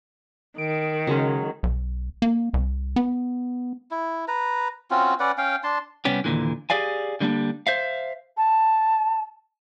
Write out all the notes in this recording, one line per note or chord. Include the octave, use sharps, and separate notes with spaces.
D#3 D7
C#3 F#3 G#3 C#4
B1
A#3
C2
B3
E4
B4 A#5
C4 C#4 F4 F#4
C#4 B4 D5 F#5
C#4 F5 G5
D4 A5 C6
C2 G3 B3 C#4 G4
D#2 A#2 D3 E3
G4 G#4 D5 F5 G#5
D3 G3 G#3 A#3 D4
C5 E5 F5
A5